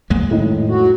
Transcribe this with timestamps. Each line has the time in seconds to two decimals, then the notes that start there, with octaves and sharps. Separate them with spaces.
0.10 F2 G#3 A#3
0.31 A2 D#3
0.69 F#3 F#4